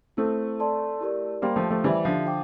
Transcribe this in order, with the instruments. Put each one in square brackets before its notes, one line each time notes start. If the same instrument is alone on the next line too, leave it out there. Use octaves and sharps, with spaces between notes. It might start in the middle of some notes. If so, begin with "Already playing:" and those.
[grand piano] A3 C4 [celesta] E4 A4 C5
[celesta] A4 D5 A5 C6
E4 G4 A#4 D5
[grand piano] G3 A#3 [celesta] G4 C5 G5 C6
[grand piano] F3 A3
F3 A3
[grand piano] E3 G3 [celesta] E4 G4 C5 E5
[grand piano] D3 F3
[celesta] C5 G5 D6